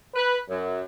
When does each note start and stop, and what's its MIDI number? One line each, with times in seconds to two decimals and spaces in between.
0.15 0.37 71
0.49 0.82 42